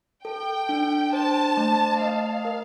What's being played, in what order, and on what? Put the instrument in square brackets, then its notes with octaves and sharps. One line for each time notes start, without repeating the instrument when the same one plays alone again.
[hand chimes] A4 [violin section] G5
[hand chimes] D4
[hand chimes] C5 [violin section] A5
[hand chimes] A3
[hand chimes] D#5 [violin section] F5
[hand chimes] A#4